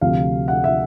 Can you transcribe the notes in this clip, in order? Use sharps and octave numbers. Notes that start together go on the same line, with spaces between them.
D2 C3 F3 F5
F#5
E5